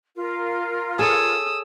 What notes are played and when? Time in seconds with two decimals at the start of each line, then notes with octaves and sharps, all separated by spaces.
0.16 F4 A#4
0.99 G#4 A4 C#5 D#6 E6